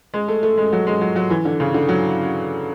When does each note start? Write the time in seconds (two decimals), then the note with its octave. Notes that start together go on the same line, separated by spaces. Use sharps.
0.14 G#3
0.28 A3
0.43 A3
0.58 G#3
0.72 F#3
0.87 G#3
1.01 F#3
1.16 F#3
1.30 E3
1.45 D3
1.60 C#3
1.74 D3
1.89 F#3